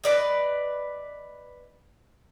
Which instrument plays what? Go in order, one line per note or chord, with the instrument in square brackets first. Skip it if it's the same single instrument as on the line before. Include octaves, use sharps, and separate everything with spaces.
[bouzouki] B4 D5 D#5